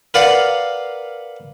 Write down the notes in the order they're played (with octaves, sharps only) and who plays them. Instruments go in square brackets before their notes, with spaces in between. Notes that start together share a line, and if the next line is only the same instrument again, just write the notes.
[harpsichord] A#4 B4 D5 F5 F#5